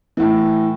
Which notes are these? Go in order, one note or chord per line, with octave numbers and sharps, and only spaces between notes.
A2 E3